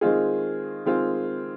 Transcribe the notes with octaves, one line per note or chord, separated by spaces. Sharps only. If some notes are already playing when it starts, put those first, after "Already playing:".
D#3 G#3 C4 F4 G#4
D#3 G#3 C4 F4 G#4